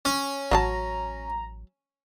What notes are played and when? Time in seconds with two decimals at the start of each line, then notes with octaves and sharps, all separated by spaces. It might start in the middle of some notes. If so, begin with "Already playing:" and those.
0.05 C#4
0.51 A1 F#3 F4 A5 A#5